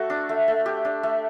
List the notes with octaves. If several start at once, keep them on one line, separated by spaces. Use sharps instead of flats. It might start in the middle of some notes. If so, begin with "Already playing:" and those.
Already playing: A3 F#4 A4
D4
A3
A3
G4
D4
A3